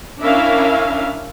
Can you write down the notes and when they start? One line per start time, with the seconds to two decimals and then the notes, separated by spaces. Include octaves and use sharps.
0.21 C#4 D4 E4 A#4 E5 F5